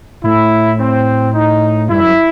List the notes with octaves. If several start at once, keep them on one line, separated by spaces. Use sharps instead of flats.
A2 E4
C4
D#4
G2 E4
F#2